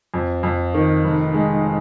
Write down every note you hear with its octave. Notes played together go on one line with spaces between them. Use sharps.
F2
F2
D#3
F1
G#3